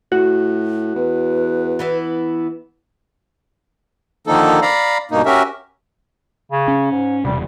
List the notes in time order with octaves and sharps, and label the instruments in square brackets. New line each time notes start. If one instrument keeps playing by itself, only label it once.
[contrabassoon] A2 [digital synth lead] F#4
[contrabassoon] E2 [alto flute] B4
[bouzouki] E3 B3 E4
[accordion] D3 D#3 F3 A#3 D#4 A4
D5 F5 A#5 B5
G2 B2 A#3 D#4
C#4 F#4 G4 A#4 E5
[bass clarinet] C#3
[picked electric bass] C#4
[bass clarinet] G#2
[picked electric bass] E1 C3 [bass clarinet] G3